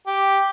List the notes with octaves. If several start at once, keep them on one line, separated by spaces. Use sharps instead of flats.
G4